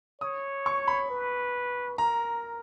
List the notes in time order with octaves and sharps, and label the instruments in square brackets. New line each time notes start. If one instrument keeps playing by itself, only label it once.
[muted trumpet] C#5 [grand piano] D#6
[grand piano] C#6
B5
[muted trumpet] B4
[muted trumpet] A#4 [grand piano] A#5